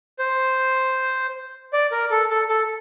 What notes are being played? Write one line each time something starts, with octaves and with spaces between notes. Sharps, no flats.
C5
D5
A#4
A4
A4
A4